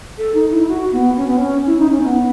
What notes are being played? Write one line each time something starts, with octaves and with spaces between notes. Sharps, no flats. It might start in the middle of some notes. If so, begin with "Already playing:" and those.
A4
D#4
E4
F#4
B3
C#4
B3
C#4
E4
D#4
C#4
B3